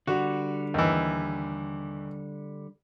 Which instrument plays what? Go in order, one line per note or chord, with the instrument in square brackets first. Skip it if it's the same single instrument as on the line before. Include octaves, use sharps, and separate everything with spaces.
[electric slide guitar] D3 G3 [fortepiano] F#4
[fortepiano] D#2 E3